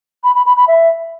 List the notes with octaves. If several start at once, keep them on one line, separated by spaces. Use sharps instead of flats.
B5
B5
B5
B5
E5